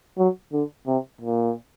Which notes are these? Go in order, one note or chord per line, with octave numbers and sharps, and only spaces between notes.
F#3
D3
C3
A#2